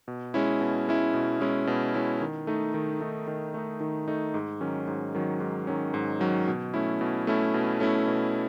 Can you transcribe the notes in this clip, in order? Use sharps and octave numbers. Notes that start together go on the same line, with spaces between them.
B2
G#3 C#4 E4
B2
G#3 C#4 E4
B2
G#3 C#4 E4
B2
G#3 C#4 E4
D#3
A3 D#4
D#3
A3 D#4
D#3
A3 D#4
D#3
A3 D#4
G#2
D#3 F#3 C#4
G#2
D#3 F#3 C#4
G#2
D#3 F#3 C#4
G#2
D#3 F#3 C#4
B2
A3 C#4 E4
B2
A3 C#4 E4
B2
A3 C#4 E4
B2